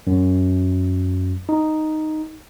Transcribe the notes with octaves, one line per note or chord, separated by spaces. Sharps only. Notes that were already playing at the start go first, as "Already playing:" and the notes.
F#2
D#4